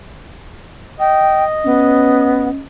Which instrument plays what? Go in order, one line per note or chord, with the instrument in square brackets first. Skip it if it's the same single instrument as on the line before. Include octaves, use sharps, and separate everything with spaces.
[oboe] D#5 [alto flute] G5
[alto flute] B3 [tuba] C#4